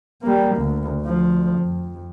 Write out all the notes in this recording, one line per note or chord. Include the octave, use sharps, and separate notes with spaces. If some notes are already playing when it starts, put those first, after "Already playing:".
G3 A#3
D2
D2 F3
F2